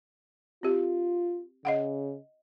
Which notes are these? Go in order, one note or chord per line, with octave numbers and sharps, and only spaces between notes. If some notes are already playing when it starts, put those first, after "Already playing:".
C4 F4 G4
C#3 D#5 F5 F#5